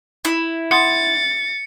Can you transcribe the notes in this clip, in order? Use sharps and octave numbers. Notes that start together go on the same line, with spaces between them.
E4
F#5 C6 D#6 A6 C#7